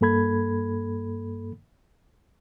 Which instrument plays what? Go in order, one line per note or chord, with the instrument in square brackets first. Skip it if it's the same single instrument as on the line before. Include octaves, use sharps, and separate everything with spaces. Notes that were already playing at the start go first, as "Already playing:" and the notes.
[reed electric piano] G2 A#3 A4 B5 G#6